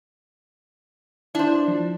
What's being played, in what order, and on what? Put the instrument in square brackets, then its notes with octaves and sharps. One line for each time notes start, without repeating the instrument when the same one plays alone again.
[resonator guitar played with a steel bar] D4 C5 [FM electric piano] E4
[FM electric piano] F3